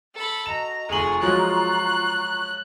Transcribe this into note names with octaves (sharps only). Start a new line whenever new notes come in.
A4 B5
F#4 D#5 A#5 E7
F1 F4 G#4 A#5 C#6 F#7
F3 F#3 G#3 F#6